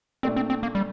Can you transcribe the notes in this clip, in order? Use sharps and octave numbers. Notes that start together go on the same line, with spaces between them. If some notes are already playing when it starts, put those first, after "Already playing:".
A#2 A3 C4 D4
C4
C4
A#3
G3